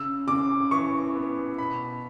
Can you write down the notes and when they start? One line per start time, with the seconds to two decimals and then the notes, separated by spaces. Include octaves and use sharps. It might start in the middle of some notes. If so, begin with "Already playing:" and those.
Already playing: C#3 E6
0.27 C#3 D6
0.71 E3 C#6
1.15 B3
1.58 B2 B5